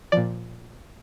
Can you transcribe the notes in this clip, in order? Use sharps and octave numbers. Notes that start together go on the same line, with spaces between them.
A#2 F3 D5